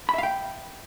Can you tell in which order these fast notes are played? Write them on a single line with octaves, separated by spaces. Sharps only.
B5 E5 F5 G5